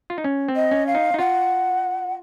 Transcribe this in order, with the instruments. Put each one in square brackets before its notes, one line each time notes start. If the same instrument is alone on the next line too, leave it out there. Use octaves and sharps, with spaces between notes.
[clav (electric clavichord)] F4
D#4
C#4
C4
[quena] D#5
[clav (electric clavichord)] C#4
[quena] F5
[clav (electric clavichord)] D#4
D#4
[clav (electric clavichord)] F4 [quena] F#5